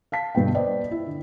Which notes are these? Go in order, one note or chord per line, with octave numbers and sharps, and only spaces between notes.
F5 A5 B6
G2 B2 D3 G5
B4 C5 D5 D#5 G5
E4
D3